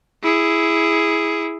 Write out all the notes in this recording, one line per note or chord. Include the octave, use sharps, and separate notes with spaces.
E4 G#4